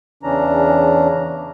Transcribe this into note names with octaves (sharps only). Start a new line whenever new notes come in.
E2 C#3 E3 C#4 D4 A#5